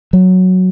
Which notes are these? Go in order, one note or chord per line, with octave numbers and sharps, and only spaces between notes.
F#3